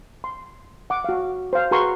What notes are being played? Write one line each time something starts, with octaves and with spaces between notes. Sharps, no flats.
C6
F#5 D6
F#4 F5
C5 F5
F#4 G#4 B4 A#5 C6 C#6